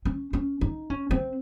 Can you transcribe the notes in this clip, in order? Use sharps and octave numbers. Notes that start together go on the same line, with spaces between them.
C#4
C#4
D#4
C#4
C4